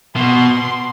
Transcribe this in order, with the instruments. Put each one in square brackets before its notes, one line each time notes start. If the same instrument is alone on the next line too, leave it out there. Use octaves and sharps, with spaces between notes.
[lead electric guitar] B2 [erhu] C6